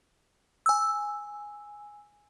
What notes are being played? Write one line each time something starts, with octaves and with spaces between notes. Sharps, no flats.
G#5 E6